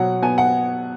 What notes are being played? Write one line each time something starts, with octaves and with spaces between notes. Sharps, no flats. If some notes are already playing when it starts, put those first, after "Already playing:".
Already playing: B2 F#3 F#5
B3 G#5
F#5